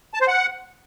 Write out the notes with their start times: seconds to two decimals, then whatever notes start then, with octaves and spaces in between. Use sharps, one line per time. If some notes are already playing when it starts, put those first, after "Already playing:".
0.14 A5
0.21 C5
0.28 F#5